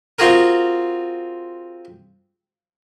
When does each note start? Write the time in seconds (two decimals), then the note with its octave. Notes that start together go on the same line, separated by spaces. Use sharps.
0.19 C4 F4 F#4 G#4 A#4